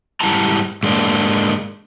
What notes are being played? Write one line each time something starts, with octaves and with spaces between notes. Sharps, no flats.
G#2 G3 E4 F#5 A5 A#5
G#2 G#3 A#3 D4